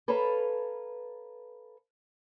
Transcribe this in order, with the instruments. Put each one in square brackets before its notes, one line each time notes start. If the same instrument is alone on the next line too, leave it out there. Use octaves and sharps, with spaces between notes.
[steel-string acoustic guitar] A4 B4 C#5 F5 A5 A#5